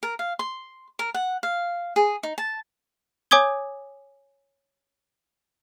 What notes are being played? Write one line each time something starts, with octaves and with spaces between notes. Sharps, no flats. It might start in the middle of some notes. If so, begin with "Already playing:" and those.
A#4
F5
C6
A#4
F#5
F5
G#4
D#4
A5
C#5 G#5 D6 D#6 G#6 G7